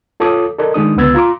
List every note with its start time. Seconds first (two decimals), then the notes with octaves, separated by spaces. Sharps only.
0.20 F4 A4 C#5 A5 D6 D#6
0.58 A4 A#4 D5 D#5
0.74 D#3 G#3 D4 D#6
0.97 C#2 D3 B3 E6 G#6 A6
1.15 F4 A#5 C6 D6